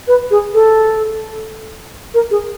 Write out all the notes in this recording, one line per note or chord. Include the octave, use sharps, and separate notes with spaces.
B4
G#4
A4
A#4
G#4